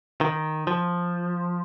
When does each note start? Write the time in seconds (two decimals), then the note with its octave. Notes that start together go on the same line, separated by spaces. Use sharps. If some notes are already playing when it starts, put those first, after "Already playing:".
0.21 D#3
0.67 F3